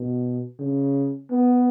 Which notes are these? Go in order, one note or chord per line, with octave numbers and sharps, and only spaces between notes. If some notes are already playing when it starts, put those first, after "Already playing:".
Already playing: B2
C#3
B3